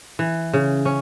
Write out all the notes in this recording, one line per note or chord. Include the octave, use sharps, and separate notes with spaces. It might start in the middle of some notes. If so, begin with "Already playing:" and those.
E3
C#3
C#4